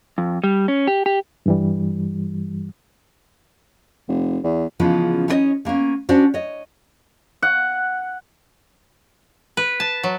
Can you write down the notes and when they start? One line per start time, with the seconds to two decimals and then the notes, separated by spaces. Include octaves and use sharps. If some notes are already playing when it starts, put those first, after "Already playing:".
0.18 F2
0.44 G3
0.68 C#4
0.87 G4
1.06 G4
1.46 G2 E3 G3
4.09 F1
4.44 E2
4.79 C#3 E3 F3 G#3 B3 C#4
5.28 C#4 D#4 E4 C5 C#5 D#5
5.65 D3 A#3 B3 C#4
6.09 C#4 D4 F#4 C5 D5
6.34 C#5 D#5
7.42 F#5
9.57 B4
9.80 A5
10.03 F#3